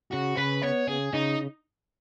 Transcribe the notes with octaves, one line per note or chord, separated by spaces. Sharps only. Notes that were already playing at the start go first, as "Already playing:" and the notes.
C#3 F#4
C#3 B4
B3 C#5
C#3 G#4
C#3 D#4